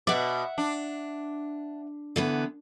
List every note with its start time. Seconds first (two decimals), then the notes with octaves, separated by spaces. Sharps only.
0.07 B2 D5 E5 F#5
0.58 D4
2.16 D3 E3 B3